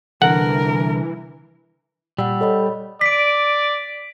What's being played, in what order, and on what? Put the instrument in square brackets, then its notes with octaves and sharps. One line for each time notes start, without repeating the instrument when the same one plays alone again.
[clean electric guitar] C2 D3 [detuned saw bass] E3 [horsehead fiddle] A#4 [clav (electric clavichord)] F#5
[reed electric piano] A#2 [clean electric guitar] G3 [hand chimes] F#5 E6
[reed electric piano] A4 [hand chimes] C#5 D#5 B5
[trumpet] D5 [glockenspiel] B6 D7